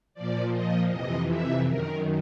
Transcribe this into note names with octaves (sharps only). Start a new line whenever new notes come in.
A#2 F3 D5
D#5
F2 C3 E3 D#5
E5
F#2 D#3 A#4